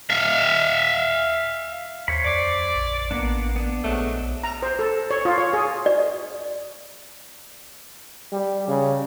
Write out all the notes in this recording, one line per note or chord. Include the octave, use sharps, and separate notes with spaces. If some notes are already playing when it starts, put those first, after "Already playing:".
E5 F5
D#2 C5 C#5 B5
F2 D5
A#1
A1 A#3 B3 D4
B3 D4
A#1 G#2 F#3 A3
A#5
C5
A4
C#5
F4
C#5
G#4
D5
G3
C#3